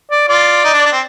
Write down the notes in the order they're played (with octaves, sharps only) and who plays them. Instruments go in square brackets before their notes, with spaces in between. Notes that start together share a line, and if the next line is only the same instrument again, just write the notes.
[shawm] D5
[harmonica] F4 [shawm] D5
[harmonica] D#4
D4
D4
C4